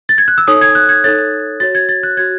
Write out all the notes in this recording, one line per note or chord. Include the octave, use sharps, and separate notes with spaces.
A6
G#6
F#6
E6
D#4 A4 C#5 D#6
G#6
F#6
G#6
D#4 A4 C#5 A6
F#4 C#5 A6
G#6
A6
F#6
F#4 C#5 G#6